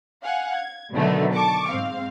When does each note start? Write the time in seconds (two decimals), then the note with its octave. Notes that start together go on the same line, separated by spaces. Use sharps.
0.23 F5 F#5 G#5
0.56 G#6
0.93 B2 D3 D#3 F#3 A3 B3
1.35 A5 C#6 D6
1.68 G#2 C4 F5